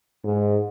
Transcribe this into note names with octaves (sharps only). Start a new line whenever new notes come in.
G#2